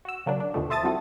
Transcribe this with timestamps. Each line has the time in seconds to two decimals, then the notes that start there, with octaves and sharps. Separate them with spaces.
0.05 F#4 E6
0.26 C#3 F#3 A#3 D4
0.40 D4
0.54 D#2 B2 D3 D#3 F3 A3
0.70 C5 E5 A5 D#6 A6
0.83 F3 G3 C4 E4 F#4 A4